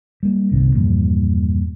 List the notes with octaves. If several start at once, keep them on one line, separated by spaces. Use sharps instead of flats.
G3 A#3
G1 C2 C3 D#3
E2 G2 A#2 F3